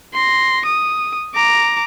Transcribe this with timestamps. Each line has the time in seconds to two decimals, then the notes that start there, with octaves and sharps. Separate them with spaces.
0.14 C6 A#6
0.66 D#6
1.35 A#5 D6